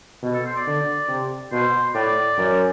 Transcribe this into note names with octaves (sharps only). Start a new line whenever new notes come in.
B2
A4
C5
D5
D3
C3
B2 C5
A2 D5
F#2